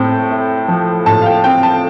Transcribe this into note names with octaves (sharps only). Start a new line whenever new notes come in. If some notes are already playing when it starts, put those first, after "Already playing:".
Already playing: A2 C4 G5
A3
F3
A2 A5
F5
G5
C4 G5
A5